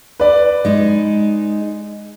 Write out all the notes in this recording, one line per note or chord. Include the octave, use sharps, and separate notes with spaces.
B4 D5
G#3 D#4